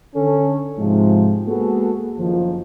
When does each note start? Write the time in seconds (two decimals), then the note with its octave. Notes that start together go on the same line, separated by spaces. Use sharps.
0.15 D3 C#4 A4
0.78 G#2 C3 F3 G#3
1.47 G#3 A#3 B3 F#4 G#4 A4
2.17 F#1 D#3 F3